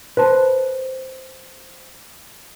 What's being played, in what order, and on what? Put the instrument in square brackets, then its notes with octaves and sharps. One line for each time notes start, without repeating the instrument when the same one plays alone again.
[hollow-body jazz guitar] B4 C5 A5